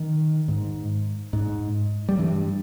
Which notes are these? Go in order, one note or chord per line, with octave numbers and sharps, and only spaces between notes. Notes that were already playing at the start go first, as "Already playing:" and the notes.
Already playing: D#3
G#2
G#2
G3
G2 E3